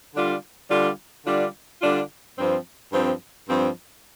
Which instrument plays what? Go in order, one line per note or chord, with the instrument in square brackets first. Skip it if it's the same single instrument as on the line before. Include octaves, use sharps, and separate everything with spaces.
[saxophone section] D3 G3 D4 F4
D3 G3 D4 F4
D3 G3 D4 F4
D3 G3 D4 F4
G2 F3 C4
G2 F3 C4
G2 F3 C4